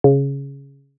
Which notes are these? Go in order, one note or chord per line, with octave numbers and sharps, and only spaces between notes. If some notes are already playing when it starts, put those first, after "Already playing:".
C#3